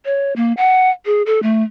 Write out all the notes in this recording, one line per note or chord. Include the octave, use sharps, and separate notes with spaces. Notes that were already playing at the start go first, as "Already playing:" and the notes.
C#5
A#3
F#5
G#4
A4
A3